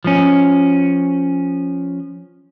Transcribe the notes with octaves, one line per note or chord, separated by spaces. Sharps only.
F3 C#4